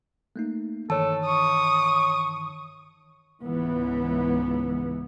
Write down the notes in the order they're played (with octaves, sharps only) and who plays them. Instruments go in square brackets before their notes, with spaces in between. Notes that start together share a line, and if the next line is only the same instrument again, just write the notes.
[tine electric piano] A3 A#3 D#4
[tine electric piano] G2 D#3 E3 [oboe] A4 [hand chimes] C#5 A5
[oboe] C#6 [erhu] D#6
[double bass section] C#2 G#2 E3 B3